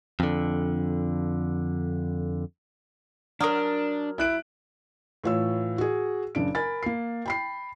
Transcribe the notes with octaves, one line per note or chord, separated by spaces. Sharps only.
F2 D3
F#3 D4 A#4 D#6 F6
E4 F#6 D7
A2 E3 F4 C#5 E6
F#4 G#4
F#1 C#3 D4 D7
A#4 G#5 B5 A6
A#3 C7
G5 B5 C7